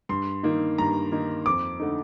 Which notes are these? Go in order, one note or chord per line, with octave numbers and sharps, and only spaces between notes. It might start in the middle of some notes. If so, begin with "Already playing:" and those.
G2 C6
D#3 A#3 D#4
G2 A#5
D#3 A#3 D#4
F2 D6
D3 A3 D#4